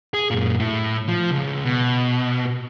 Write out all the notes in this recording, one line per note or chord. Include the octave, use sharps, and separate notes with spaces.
G#4
F#2 A#2
A2
F3
C#2
B2